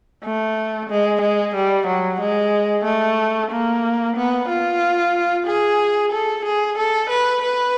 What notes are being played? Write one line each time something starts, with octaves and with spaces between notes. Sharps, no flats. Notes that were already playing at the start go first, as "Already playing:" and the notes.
A3
G#3
G#3
G3
F#3
G#3
A3
A#3
B3
F4
G#4
A4
G#4
A4
B4
B4